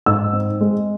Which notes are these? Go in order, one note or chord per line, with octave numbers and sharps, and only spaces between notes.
G#2 E6
C4
G#3